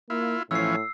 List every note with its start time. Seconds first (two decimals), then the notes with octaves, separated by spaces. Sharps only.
0.10 A#3 E4 F4
0.51 A2 E3 F3 C#4 E6 C7